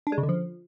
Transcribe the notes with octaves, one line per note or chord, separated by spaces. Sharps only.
D4
G#3
C#3
D3
F3